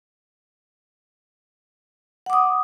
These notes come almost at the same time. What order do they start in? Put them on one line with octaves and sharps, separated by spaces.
F#5 D6 D#6